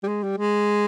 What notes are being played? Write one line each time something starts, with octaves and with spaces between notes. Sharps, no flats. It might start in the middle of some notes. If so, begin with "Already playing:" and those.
G3
G#3
G3
G#3